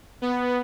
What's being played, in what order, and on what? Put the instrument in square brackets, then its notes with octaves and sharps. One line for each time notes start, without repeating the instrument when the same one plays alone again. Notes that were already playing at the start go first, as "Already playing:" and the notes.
[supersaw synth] B3